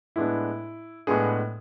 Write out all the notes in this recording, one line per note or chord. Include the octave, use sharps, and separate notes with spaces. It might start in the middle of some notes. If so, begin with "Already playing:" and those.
A2 G#3 B3 D4 E4
A2 G#3 B3 D4 G#4